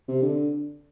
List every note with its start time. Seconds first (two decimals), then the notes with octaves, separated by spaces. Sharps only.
0.08 C3
0.22 D3